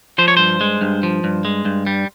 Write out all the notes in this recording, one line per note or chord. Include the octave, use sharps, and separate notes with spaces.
F3 C5
C#5
G2 C5
G#3
G2
F3
G2
G#3
G2
G3